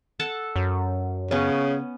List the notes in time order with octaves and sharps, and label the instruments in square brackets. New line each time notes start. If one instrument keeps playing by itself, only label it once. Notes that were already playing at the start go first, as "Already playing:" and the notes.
[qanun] A4 F#5 A5
[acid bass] F#2
[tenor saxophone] C#3 [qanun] B3 C#4 [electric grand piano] C#5